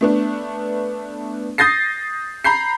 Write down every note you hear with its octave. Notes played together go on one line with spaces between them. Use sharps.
A3 B3 D4
D#6 G6 A6 A#6 C7
A#5 B5 G6 C7